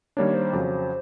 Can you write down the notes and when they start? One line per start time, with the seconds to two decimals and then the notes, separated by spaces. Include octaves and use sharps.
0.17 D#3 G3 A#3 D4 C#5
0.34 C5
0.53 F2 C#3 F#3